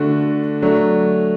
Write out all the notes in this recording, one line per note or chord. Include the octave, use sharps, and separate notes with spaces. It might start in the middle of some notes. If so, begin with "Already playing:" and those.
Already playing: D3 A3 D4 F#4
F#3 A3 D4